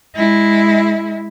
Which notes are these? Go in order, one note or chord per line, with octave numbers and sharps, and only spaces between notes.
G#3 E4